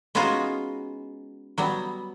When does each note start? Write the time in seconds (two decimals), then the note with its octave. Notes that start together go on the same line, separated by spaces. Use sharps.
0.15 G#3 B3 C#4 D#4 F4 F#4
1.58 F#3 G3 B3